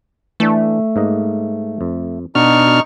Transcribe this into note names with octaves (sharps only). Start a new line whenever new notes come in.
E3 A3 D4
G#2 A#3 D#5
F2
B2 D4 D#4 F#4 C#6 F6